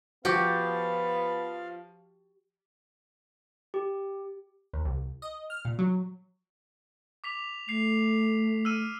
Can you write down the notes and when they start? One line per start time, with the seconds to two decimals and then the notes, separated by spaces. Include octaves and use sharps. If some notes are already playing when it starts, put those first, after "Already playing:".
0.25 F3 B3 F#4 G4 F5
3.74 G4
4.73 D#2
4.85 C2
5.22 D#5
5.50 F6
5.65 A#2
5.79 F#3
7.24 D6 B6 F7
7.68 A3 C7 F7
8.65 E6 F6 D#7